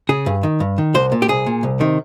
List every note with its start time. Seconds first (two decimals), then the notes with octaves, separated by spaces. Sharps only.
0.09 C#3 G#4
0.26 G2
0.43 D#3
0.60 G2
0.78 D#3
0.94 C2 C5
1.12 A#2
1.22 G4
1.28 C2 G#4
1.46 A#2
1.63 C2
1.80 C3 D#3